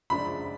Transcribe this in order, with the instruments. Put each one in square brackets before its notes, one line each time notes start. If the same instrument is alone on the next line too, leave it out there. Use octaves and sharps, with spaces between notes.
[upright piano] F#1 F#2 F3 G#3 D4 [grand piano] B5